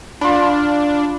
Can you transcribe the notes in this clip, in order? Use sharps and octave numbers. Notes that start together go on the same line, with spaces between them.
D4 F4 B5